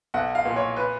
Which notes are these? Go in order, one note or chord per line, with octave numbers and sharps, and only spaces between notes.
B1 F#5
F5
A#2
C#5
B4